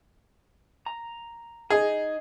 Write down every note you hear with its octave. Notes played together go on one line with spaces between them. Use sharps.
A#5
D#4 G#4 D#5